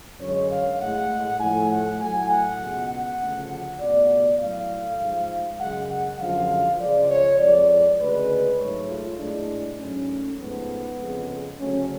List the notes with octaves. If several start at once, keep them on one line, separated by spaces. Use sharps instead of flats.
F#2 D3 G#3 C#5
F5
A2 G#3 F#5
A2 F3 A3 G#5
F#5
A2 F#3 A3 G#5
F#5
C#2 B2 G#3
F#5
D2 C#3 F3 A3
F#5
C#2 B2 A3 D5
A2 F#3 A3 F5
G#2 F3 G#3
F#2 C#3 G#3 F#5
F#5
F#2 D3 F3 G#3 F5
C#2 C#3 F3 G#3 D5
C#5
F2 F3 G#3 D5
D2 C#3 G#3 B4
G#2 F#3 A3 C#5
F4
A2 G#3 D4
G#2 F#3 A3 C#4
G#2 F3 A3 B3
F2 C#3 G#3
D2 C#3 F#3 A3 C#4